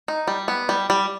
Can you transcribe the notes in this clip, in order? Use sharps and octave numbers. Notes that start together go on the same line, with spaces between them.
D#4
G3
B3
G3
G3